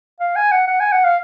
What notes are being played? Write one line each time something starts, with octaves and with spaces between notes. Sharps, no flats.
F5
G#5
F#5
F#5
G#5
F#5
F5